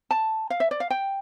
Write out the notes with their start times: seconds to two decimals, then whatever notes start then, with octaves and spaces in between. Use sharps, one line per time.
0.11 A5
0.50 F5
0.60 E5
0.71 D5
0.80 F5
0.90 G5